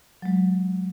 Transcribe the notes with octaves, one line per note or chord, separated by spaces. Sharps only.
F#3 G#3